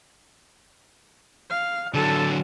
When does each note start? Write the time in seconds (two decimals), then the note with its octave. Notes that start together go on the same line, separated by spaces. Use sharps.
1.50 F5
1.94 D3 F#3 A4